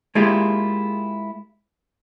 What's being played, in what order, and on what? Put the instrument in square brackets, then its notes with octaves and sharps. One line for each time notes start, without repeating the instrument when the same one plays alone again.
[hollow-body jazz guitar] G#3 A#3 E4 F4 G4 G#4